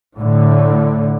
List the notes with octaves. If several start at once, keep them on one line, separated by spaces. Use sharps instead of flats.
A2 D3